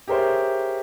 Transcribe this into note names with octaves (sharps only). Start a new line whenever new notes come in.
G4 G#4 A#4 C5 C#5 E5